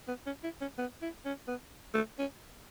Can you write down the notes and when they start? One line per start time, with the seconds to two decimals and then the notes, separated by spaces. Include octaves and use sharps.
0.08 B3
0.26 C#4
0.44 E4
0.61 C#4
0.78 B3
1.02 E4
1.25 C#4
1.48 B3
1.94 A3
2.19 C#4